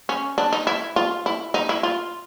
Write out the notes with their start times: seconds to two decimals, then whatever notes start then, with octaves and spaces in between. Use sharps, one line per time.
0.09 C#4
0.38 D4
0.52 D#4
0.67 E4
0.96 F4
1.26 E4
1.54 D#4
1.69 E4
1.83 F4